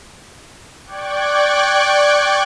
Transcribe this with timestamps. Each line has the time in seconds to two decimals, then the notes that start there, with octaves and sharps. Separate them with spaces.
0.84 D5 G5 C#6 D6 F#6 G#6